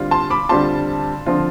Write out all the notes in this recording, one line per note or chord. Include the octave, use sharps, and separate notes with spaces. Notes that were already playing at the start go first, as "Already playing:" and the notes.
Already playing: D3 G3 C4 F4
A5 C6
B5 D6
D3 G3 C4 F4 A5 C6
D3 F3 C4 F4